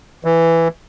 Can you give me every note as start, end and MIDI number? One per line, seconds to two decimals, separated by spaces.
0.25 0.68 52